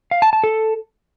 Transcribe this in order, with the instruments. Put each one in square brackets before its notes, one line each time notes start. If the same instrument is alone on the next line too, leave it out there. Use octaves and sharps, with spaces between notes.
[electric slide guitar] F5
A5
A5
A4